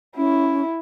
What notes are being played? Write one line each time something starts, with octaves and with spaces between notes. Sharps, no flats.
C#4 E4